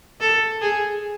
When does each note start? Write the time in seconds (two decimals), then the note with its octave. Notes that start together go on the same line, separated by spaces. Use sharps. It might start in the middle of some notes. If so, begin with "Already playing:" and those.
0.20 A4
0.61 G#4